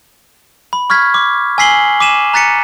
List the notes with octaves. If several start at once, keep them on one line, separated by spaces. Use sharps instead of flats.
B5
C#6 F6 G#6 B6
D6
G#5 E6 B6 C7 F#7 G7
D6 B6 D#7 E7 F#7
A#5 F#6 A6 B6 C#7 D#7